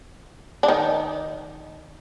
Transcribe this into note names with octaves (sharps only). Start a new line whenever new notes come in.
D4
D#3 D#4